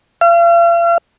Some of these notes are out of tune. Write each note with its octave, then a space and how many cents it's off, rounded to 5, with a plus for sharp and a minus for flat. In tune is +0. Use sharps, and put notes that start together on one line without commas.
F5 -40